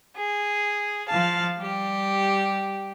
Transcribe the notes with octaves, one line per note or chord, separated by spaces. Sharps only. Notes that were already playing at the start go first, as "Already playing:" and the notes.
G#4
F3 F5 A5
G3 G4